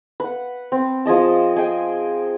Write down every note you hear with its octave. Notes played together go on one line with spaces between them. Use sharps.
B4 F#5
C4
F3 G#4 D#5 A5
G#4 D#5 G5